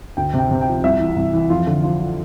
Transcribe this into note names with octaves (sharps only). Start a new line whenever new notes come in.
D2 G5
C3 G5
C3
G5
F3
C2 E5
E3
C2
E3
F2 F4
D3
F3 F4
F3